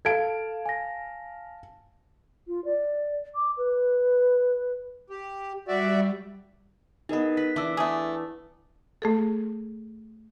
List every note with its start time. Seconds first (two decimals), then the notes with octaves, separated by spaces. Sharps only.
0.05 A4 F5 A5 G#6 D7
0.66 G#5 A#6
2.47 F4
2.65 D5
3.35 D6
3.57 B4
5.10 G4
5.68 G3 F#4 D5 E5
7.09 B3 D#4 G#4 A#4 D#5
7.37 B4 B6
7.56 E3 D4 A4 E5 D6 E6
7.77 A3 B3 G#4
9.02 A3 G#4 A4